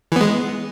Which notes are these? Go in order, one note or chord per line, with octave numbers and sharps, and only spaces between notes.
E3 G#3 B3